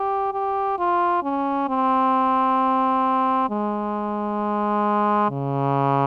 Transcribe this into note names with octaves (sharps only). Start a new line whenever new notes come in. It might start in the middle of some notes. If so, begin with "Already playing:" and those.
Already playing: G4
G4
F4
C#4
C4
G#3
C#3